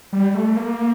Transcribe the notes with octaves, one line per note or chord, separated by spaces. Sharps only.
G3
A3
A#3